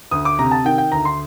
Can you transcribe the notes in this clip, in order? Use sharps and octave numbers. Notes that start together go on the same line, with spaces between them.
D2 D#6
D6
C3 A#5
A5
D#3 G5
G5
D2 A#5
C6